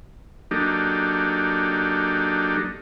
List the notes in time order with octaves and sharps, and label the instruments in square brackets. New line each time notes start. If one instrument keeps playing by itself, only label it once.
[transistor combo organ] F#3 A#3 D4 D#4 G4 A4